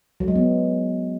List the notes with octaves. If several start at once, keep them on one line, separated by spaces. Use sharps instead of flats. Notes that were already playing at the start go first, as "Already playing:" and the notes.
F#3
G#3
B3